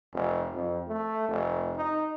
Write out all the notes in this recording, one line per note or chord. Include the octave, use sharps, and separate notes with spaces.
F1
F2
A3
F1
D#4